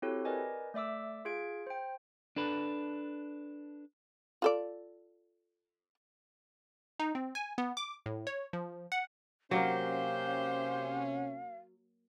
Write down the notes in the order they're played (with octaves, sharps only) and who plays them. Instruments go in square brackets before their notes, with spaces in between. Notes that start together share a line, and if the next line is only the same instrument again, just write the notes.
[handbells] C4 E4 F#4 G4 A4 C#5
A#4 B4 D5 D#5 G#5
A3 D5 E5 D6 E6
F4 G#4 F5 G#6 D7
C5 G5
[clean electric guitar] D4 A4 B4
[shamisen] F4 A4 D5
[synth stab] D#4
C4
G#5
B3
D6
A2
C#5
F3
F#5
[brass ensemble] C3 C#4 [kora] F#3 A#3 [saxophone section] G4 C5 [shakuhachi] F5